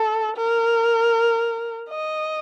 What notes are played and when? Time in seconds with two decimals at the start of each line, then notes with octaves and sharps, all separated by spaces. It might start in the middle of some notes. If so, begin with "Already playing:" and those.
Already playing: A4
0.37 A#4
1.89 D#5